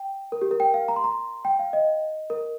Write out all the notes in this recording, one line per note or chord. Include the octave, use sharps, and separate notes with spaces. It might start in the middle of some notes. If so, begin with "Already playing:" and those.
Already playing: G5
A#4
G4
A#4
G5
F5
A#5
C6
A#5
G5
F5
D#5
A#4